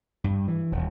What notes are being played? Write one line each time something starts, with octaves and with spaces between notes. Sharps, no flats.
G2
E3
D#1